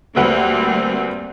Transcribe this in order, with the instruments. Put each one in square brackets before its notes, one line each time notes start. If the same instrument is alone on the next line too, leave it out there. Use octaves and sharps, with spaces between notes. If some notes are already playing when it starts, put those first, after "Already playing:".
[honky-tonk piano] D2 B4 F#5 [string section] G3 A#3 C4